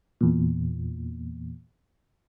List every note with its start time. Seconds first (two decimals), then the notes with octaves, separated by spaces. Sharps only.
0.21 E2 A#2